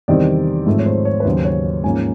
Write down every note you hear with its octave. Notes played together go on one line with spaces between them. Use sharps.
E2 C3 D#3 G3 C4 D5
G#2 F3 A3 C4
C#5
C5
C#5
B4
D#2 C#3 F#3 C5
C#5
G#2 F3 A#3 C#4 G#5